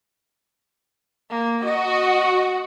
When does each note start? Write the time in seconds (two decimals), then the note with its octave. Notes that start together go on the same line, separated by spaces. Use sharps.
1.30 A#3
1.64 F#4 D#5